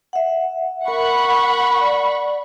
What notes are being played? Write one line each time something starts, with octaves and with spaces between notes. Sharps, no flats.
E5 F#5
A#4 F#5 B5 C#6
D5